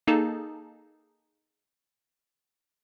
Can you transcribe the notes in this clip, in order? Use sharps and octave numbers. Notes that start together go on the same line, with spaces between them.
A#3 D#4 G#4 A4 A5